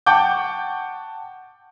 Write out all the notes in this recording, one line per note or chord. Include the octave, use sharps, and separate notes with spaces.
F#5 G5 A5 C#6 D6 G6